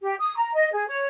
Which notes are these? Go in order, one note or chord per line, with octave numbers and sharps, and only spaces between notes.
G4
D#6
A#5
D#5
G#4
C#5